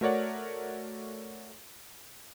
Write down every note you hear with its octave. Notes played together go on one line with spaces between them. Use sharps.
A3 F#4 A#4 C#5 D5 F#5